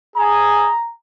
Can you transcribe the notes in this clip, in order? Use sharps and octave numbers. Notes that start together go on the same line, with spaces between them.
G#4 G#5 A#5 D#6